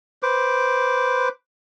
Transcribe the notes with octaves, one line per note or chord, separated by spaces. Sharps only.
B4 C5 D6